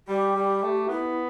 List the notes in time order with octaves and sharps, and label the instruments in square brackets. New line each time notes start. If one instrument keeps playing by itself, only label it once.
[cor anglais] G3 [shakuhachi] G4
[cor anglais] G3
A3
[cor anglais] B3 [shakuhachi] E4